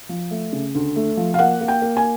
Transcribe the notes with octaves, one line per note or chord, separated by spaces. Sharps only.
F3
A3
C#3
D2
A3
F3
F5
A#3 F#5
A#3
G5
A#3
G#5